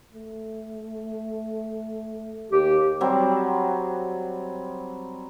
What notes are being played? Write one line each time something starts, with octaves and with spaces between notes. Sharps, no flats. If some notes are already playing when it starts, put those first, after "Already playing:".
A3
D#2 G4
F#3 G3 C4